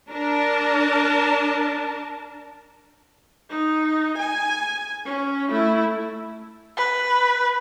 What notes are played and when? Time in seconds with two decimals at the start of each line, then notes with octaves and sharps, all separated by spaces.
0.10 D4 A#4 A5
3.50 D#4
4.18 G#5
5.05 C#4
5.50 A3 E4
6.77 B4